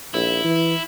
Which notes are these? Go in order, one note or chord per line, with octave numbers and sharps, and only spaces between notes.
A#1 E4
E3